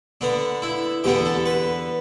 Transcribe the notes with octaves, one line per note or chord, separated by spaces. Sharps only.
D3 B3 D4
E4
E2 D3 B3 D4 G4
A4
B4